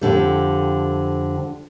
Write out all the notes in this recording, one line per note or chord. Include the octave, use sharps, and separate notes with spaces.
F2 D3 G3